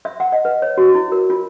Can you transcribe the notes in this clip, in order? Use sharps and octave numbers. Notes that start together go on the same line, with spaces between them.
E5
F#5
D#5
B4
C#5
F#4
E4
A#4
F4